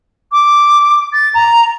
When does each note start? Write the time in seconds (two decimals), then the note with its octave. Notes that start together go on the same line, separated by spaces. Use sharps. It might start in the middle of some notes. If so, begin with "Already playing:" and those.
0.32 D6
1.13 A6
1.34 A#5